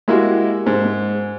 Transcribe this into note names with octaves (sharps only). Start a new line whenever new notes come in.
G#3 A#3 E4 F#4 G4
G#2